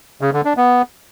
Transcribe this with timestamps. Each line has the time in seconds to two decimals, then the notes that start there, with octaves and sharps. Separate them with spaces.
0.21 C#3
0.33 D3
0.45 D4
0.57 B3